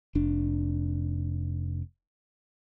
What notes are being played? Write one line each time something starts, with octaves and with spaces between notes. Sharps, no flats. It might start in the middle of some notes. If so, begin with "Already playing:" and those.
F1 D4